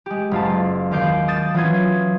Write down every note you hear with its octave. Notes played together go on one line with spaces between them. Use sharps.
G#3 G4
F#1 F4 A5
D#2 D#3 F5 D6 G6 D7
D#6 G6 A6 E7
E3 F#3 C#4 F4 D#6 G#6